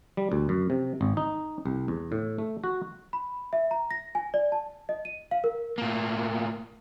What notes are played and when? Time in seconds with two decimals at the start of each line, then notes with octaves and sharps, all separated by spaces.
0.17 G3
0.32 D2
0.49 F#2
0.70 C3
1.01 G#1
1.17 D#4
1.65 C2
1.88 E2
2.12 A2
2.38 A3
2.64 F#4
3.13 B5
3.53 E5
3.71 A#5
3.91 A#6
4.15 G#5
4.34 D5
4.52 A5
4.89 D#5
5.05 D#7
5.31 F5
5.44 A#4
5.78 A2 A#3